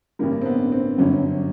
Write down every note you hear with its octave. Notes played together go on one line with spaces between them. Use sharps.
A1 G2 D3 G3 A#3
C4
B3
C4
G1 F#2 D3 F#3 C#4